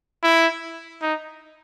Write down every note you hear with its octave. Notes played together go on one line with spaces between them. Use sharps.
E4
D#4